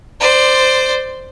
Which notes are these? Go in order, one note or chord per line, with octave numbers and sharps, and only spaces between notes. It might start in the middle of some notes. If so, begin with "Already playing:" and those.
C5 D5